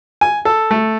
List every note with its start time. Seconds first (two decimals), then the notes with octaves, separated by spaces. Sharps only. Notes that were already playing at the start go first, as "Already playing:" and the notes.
0.21 G#5
0.45 A4
0.71 A3